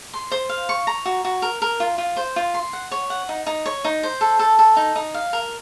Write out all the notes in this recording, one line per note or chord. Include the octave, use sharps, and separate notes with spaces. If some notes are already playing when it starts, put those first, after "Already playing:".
C6
C5
F5
C#6
A#5
F#4
F#4
A#4
A#4
F4
F4
C5
F4
C6
F#5
C#5
F#5
D#4
D#4
C#5
D#4
C5
A4
A4
A4
D#4
D#4
F5
A#4